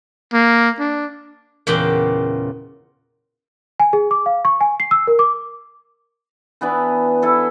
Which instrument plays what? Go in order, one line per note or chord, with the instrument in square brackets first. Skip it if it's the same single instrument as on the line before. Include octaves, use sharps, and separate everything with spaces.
[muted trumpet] A#3
D4
[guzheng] E2 A#2 C#3 G5
[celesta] G#5
G#4
D6
F5
C#6
G#5
C7
E6
A#4
D6
[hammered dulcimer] E3 B3 D4 B4
E4 A4 B4